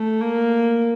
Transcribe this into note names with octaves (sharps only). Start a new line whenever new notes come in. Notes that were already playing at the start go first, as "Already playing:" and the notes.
Already playing: A3
A#3